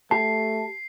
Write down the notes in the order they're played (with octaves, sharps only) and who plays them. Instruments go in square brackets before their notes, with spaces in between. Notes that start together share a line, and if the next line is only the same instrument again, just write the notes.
[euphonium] A3 [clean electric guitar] G4 A5 [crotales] C7